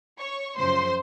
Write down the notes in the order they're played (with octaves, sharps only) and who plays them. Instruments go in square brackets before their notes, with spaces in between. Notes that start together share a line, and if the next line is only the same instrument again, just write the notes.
[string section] C#5 C#6
F#2 C#3 F3 C5 C6